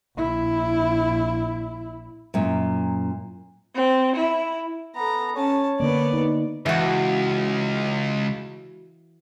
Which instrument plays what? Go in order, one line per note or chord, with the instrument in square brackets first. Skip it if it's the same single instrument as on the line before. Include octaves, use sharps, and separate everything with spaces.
[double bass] A#1 E4
[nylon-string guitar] F#2 A#2
[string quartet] C4
E4
[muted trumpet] B3 [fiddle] A4 A#5
[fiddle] C#4 A5 [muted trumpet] C#5
[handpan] D3 A#3 [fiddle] B3 D5
[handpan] D#4
[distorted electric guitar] C#2 [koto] E3 F#4